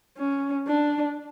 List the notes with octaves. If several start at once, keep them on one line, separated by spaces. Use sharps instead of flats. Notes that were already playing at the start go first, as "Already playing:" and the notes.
C#4
D4